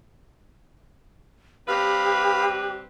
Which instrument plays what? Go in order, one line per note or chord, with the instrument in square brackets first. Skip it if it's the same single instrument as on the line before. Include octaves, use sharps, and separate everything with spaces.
[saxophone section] G2 C4 B4 [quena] G4 [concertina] F5 B5